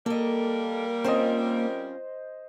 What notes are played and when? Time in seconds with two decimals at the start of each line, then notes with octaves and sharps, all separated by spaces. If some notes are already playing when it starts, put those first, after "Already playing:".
0.06 G3 A#3 A4 A#4 D#5
1.04 C4 C#4 F4 C5 D#5